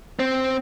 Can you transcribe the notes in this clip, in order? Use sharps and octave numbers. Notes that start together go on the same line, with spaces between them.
C4